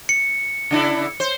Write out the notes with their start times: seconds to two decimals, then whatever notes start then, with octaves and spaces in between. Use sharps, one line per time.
0.09 C#7
0.71 C#3 D4 E4
1.20 C5